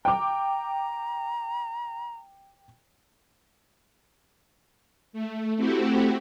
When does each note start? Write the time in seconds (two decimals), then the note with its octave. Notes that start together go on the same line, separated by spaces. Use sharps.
0.05 G5 A#5 D6
5.13 A3
5.56 A3 C4 E4 F#4 G4